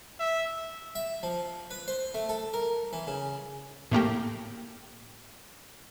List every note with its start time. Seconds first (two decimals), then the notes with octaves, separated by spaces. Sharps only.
0.19 E5
0.95 E5
1.23 F3
1.71 B4
1.88 C5
2.14 A3
2.29 A4
2.54 A#4
2.93 E3
3.07 C#3
3.91 A2 A3 A#3 G4